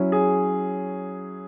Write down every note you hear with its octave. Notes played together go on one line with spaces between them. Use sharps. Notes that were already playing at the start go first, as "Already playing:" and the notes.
Already playing: F#3 C#4 E4
G#4